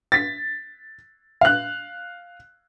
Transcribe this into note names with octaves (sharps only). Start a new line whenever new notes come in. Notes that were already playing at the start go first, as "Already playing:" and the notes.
A6 B6
F5 F#6